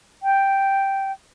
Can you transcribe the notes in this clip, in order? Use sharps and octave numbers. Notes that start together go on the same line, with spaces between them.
G5